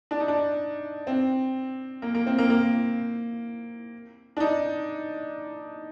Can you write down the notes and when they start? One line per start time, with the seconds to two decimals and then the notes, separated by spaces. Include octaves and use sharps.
0.11 D4
0.20 D#4
0.28 D4
1.07 C4
2.02 A#3
2.15 A#3
2.26 C4
2.38 A#3
2.50 A#3
4.37 D4
4.40 D#4